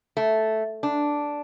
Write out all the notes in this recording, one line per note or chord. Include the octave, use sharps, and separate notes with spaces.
A3
D4